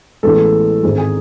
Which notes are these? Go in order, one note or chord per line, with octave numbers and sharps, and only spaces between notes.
A1 A2 E3 G#3 B3 A4
G#1 G#2 G#3
G#4